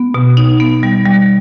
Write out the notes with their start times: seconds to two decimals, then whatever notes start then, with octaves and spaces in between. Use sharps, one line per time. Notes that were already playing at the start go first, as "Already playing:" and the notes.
Already playing: B3
0.14 B2
0.37 D#4
0.60 B3
0.83 G3
1.06 G3